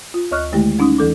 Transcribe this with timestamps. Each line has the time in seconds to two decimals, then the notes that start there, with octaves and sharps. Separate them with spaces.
0.14 F4
0.31 D2 C#5 D#5 C#6 F6 F#6
0.52 D3 D#3 G#3 A3 E4 G4
0.79 G3 C#4 D#4 D#6
0.98 E2 E3 A4 D6